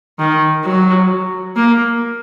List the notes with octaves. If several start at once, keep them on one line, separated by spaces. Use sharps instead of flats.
D#3
F#3
A#3